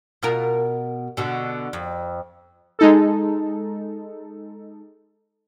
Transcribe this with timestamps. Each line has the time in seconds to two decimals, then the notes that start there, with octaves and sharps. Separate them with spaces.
0.23 B2 F4 A#4
1.17 B2 D3
1.73 F2
2.79 G#3 D#4 A4